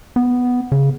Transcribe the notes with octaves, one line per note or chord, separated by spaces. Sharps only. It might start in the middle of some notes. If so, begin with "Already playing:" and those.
B3
C#3